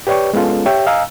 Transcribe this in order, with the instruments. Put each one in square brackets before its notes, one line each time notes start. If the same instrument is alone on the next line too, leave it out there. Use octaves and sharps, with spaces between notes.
[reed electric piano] G4 B4 C#5 D5 G5 C#6
G#3 B3 C#4 F4 A4
G4 C#5 E5 G5
D#5 F5 G#5 A#5 E6